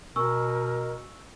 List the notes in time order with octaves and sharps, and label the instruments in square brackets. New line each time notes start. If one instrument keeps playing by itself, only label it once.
[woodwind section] B2 [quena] A#4 [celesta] G#5 C#6 E6